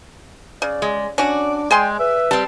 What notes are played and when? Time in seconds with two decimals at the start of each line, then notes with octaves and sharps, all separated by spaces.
0.62 C#3 D5
0.82 G#3
1.18 C#4 D4 F#4 D5
1.71 G#3 G#4 G5 G#5 C6
1.99 B4 E5
2.31 G3 C4 A5